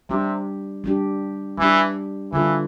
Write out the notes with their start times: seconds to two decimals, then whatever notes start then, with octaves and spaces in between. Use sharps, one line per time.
0.09 C3 G3 D4 G4
0.84 G3 D4 G4
1.58 E3 G3 D4 G4
2.33 D3 E3 G3 D4 F4 A4